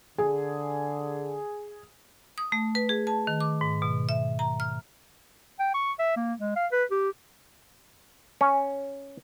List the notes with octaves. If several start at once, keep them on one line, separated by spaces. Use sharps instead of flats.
D3 G#4
D#6
A3
B4
G#4
A5
D#3
D6
G#2
B2
E5
A#5
F6
G5
C#6
E5
A#3
G#3
F5
B4
G4
C#4